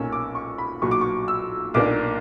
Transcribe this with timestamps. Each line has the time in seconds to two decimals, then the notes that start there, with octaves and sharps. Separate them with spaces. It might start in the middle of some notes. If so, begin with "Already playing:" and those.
Already playing: B1 A#2 A#3 C#4 E6
0.12 D6
0.35 C#6
0.58 B5
0.82 B1 A#2 F#3 C#6
0.91 D6
1.01 C#6
1.28 E6
1.74 B1 A#2 A#3 D4 D6